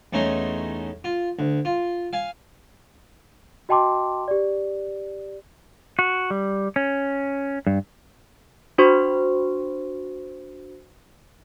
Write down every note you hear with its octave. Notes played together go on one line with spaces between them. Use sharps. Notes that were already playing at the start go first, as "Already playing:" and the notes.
E2 A3 C#4 D#4 A#5 C6
F4
D2
F4
F5 G#5
F#4 D#5 G5 A5 C6 D6
G4 D5
F#4
G3
C#4
G2
D4 F#4 C5 C6 C#6